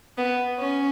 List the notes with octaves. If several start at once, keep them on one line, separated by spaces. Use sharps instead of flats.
B3
C#4